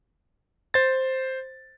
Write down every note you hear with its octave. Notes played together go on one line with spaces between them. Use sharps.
C5 A6